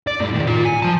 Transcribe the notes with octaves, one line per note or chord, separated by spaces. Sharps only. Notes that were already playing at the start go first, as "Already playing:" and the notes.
D5
G2 A3
A2 D#3
F4 D5
G#5
F3 A5